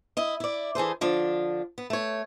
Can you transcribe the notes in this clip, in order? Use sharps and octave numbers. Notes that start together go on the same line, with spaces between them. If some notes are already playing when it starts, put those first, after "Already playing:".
E4 D#5
E4 D5
E3 G#4 A4 C5
D3 F3 D4
B3
A3 C#5